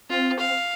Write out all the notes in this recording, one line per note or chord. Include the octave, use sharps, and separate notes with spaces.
C4 F4
F5